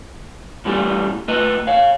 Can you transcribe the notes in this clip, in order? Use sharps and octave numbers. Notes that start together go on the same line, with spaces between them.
A2 E3 G3 A3
A3 B4 D#5
C#5 F5